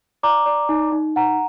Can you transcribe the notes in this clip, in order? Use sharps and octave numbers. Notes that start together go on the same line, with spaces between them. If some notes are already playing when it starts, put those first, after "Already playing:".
D5 A#5 D6
D5
D#4
D#4
D#4 F#5 A#5